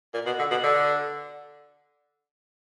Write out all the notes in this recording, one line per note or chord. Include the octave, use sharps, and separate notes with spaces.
A#2
B2
D3
B2
D3